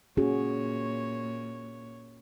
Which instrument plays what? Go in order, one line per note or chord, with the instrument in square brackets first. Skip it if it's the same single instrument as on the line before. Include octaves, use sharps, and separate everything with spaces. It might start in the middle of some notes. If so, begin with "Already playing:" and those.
[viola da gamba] A#2 C#5 [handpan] C#4 F#4 G#4